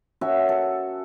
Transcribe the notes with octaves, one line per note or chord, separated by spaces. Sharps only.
C#4 F#4 A#4 E5
A4